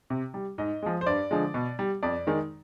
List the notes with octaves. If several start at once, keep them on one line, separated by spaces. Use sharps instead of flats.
C3
G3
G#2 D#5
F3 G#3
C5
G2 D5
D3 F3 G#3
B2
G3
F2 D5
D#3 G#3